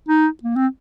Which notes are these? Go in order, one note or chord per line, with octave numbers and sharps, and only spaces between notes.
D#4
A#3
C4